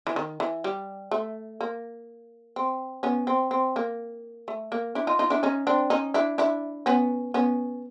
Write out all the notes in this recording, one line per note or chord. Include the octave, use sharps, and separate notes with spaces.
E3
D#3
E3
G3
A3
A#3
C4
B3 C#4
C4
C4
A#3
A3
A#3
D4 E4
D#4 F4
D#4 F4
D4 E4
C#4 D#4
C4 D4
C#4 D#4
D4 E4
D4 E4
B3 C#4
B3 C#4